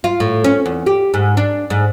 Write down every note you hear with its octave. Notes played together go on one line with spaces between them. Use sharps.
F4
A2
C#4
E2
G4
G#2
D4
G#2